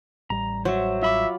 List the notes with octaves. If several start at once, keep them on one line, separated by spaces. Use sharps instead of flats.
A1 G3 A#5
F#3 C5 E5
F4 E5 B5 D6